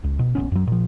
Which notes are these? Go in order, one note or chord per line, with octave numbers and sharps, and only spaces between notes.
C#2
B2
A#1 A2 B3 C#4
F#2 F#3
A#2 F3